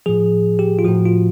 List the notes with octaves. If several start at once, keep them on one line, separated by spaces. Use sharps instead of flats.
A2 F3 G#4
G4
F4
A2 F3 F#4
F4